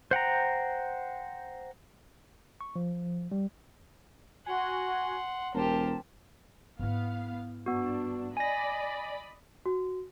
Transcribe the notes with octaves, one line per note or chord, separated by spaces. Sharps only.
C5 F#5 G5 A#5
C#6
F3
G3
F#4 F#5 G#5 C6
E1 G4 A#4 C5 A5
G#2 B3 E4 F5
G2 B3 D4 F#4
D5 D#5 G#5 B5 A#6
F#4